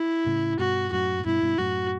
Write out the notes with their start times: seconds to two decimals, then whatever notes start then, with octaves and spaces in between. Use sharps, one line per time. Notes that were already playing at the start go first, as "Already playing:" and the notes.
Already playing: E4
0.26 A2 C#3
0.59 G2 B2 F#4
0.92 F#2 A2 F#4
1.19 A2
1.26 G2 B2 E4
1.42 G2 B2
1.58 F#2 A2 F#4